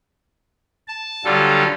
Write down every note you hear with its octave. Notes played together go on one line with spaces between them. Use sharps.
A5
D3 F#3 G3 F4 A4